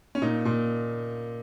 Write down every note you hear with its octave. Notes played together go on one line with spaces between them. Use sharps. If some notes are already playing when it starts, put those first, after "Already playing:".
C#4
A#2 D#4
A#2